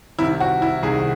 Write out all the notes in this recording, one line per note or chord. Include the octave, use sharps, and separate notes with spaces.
C2 C3 D#3 E4
F#4
E4
C2 C3 D#3 G#4